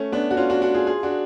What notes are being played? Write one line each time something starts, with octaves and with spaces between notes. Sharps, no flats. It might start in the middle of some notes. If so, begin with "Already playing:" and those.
Already playing: A3 C#4
B3 D4
F#4
C#4 F4
D4 F#4
D4 F#4
F4 G#4
F4 G#4
D4 F#4